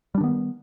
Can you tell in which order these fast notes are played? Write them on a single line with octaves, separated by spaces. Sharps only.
G3 D4 D#3 B3